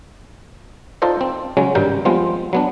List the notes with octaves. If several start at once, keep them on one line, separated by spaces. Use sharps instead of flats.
D#4 F4 A4 C5 D5 D#5
C4
C#3 F#3 G#3 C#4
G#1 G2 G3 A#4 G5
F3 G3 G#3 B3 C4 F4
F#3 B3 D4